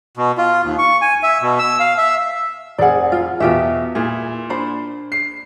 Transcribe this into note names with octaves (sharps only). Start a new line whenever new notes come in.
B2
F4
D#2
C#6
G#5
E5
B2
E6
F5
E5
F1 G#4 D5 F#5
F4
E2 B2 F4 G4 E5
A#2 E4 G#4
D4 C5 B5
C7